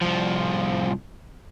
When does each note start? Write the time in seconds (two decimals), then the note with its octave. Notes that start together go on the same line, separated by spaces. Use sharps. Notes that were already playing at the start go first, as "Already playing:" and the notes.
0.02 C2 F3